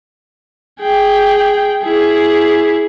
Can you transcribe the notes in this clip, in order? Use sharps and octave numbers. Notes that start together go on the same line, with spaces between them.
G#4 G5
E4 G#4